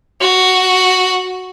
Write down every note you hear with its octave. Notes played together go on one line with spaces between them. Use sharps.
F#4